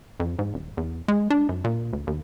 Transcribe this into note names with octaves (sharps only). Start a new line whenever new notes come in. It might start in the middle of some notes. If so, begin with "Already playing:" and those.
F2
G#2
D#1
E2
G#3
D4
F#2
A#2
D2
D#2